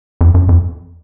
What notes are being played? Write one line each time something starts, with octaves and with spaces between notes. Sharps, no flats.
F2
F#2
F2